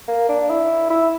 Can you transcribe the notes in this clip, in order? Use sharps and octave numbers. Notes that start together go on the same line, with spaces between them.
A#3
D4
E4
E4